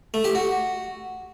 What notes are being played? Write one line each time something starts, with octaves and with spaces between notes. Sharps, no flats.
A3
G4
F#4